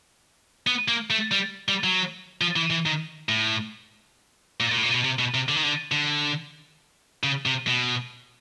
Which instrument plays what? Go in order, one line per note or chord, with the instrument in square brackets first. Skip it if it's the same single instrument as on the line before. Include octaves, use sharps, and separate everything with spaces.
[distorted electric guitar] B3
A#3
A3
G3
G3
F#3
F3
E3
E3
D#3
A2
A#2
A#2
A2
A#2
B2
C3
B2
C3
D3
D#3
D3
D3
C#3
C3
B2